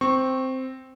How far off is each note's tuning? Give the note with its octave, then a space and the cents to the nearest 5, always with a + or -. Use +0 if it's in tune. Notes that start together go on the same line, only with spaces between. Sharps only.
C4 -5 C#6 -15